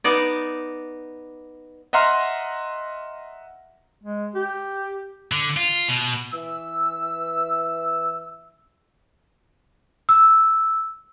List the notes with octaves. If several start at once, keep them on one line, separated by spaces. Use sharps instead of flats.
B3 D#4 D5
D#5 E5 F#5 A#5 C6 F6
G#3
G4
D3
F4
B2
E3 E5 E6
E6